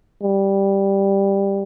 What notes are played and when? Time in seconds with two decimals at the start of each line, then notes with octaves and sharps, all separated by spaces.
0.23 G3